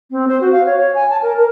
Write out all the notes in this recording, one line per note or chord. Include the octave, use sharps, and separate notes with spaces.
C4
C5
F#4
F5
C#5
C#5
G#5
A5
A#4
A#4